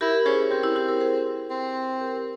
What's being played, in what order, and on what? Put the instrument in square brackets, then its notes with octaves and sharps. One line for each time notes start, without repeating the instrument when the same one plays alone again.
[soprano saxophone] E4 [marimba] G4 A#4
[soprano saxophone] C#4 [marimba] G#4 C5
[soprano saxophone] C4 [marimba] G4 A#4
[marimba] E4 G4
E4 G4
G4 A#4
G#4 C5
[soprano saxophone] C4
[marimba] G4 A#4